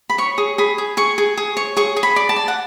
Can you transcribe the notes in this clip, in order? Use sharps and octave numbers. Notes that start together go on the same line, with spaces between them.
B5
C#5 C#6
G#4
G#4 B5
G#4
G#4 C#6
G#4
G#4
C#5
G#4 C#6
G#4
B5
D5
A5
D5
F#5